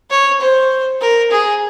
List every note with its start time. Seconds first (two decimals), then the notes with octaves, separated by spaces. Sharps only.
0.10 C#5
0.41 C5
1.01 A#4
1.31 G#4